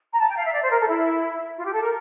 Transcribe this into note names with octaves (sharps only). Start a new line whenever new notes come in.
A#5
A5
G5
F5
E5
D5
C5
A#4
A4
E4
F4
G4
A4
A#4